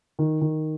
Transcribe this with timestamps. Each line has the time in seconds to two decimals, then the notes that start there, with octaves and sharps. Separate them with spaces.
0.19 D#3
0.41 D#3